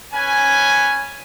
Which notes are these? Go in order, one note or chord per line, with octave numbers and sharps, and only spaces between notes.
C#4 B4 G#5